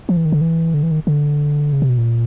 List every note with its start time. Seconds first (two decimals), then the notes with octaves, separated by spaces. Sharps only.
0.09 F3
0.17 E3
0.25 D#3
0.32 D3
0.41 E3
0.74 D3
0.83 E3
0.91 D#3
1.07 D3
1.73 C#3
1.82 C3
1.89 B2
1.98 A#2